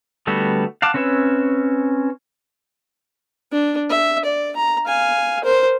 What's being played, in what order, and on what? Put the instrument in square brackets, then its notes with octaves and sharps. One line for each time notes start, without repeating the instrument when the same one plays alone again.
[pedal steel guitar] D3 G3 A3 B3 F#4
F5 F#5 A5 D6
C4 C#4 B4 C#5 E5
[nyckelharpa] D4
E5
D5
A#5
F5 G#5
A#4 C5